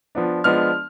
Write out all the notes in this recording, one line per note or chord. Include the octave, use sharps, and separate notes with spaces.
F3 B3 D4
F3 G#3 B3 D4 F6